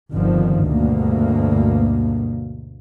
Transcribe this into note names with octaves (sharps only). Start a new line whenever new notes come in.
G1 F2 D3 D#3 F3
D2 G2 B2 A#3